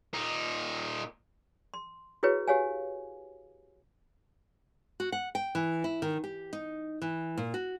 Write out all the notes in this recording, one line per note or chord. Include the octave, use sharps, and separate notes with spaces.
A#2 D#4
C6
E4 F#4 G#4 B4 C#5
G4 C#5 F5 G#5
F#4
F#5
G5
E3
E4
D#3
G4
D#4
E3
A#2
F#4